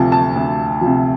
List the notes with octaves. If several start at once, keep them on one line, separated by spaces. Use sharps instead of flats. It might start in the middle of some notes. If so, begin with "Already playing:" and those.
Already playing: D2 C3 F3 A5
A5
D2
C3 F3